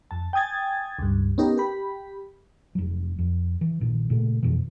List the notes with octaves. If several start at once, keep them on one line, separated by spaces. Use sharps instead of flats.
F2 A5
G5 G#5 D#6 G#6 A6
C#2 G2
B3 C#4 D#4 G4 A#4
G4 B5
F1 F#3
F2
E3
A#1 A#2 D#3
A#2 C#3 A3
F2 B2 D#3 E3